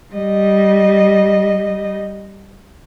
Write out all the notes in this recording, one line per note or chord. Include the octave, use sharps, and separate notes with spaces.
G3 D#5